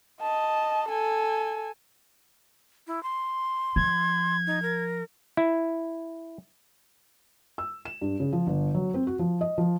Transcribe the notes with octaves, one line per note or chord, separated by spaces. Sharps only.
D#5 A5
A4 G#5
E4
C6
F3 G#6
D#4
A#4
E4
E6
E7
G2
C#3
F3
G1
F#3
C4
F#4
F3
D#5
F3